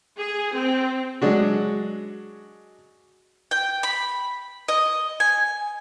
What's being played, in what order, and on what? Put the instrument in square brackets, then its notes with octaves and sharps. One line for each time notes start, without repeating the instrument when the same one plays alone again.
[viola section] G#4
C4
[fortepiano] F#3 G#3 D4 F#4
[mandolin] G5
B5
D#5
G#5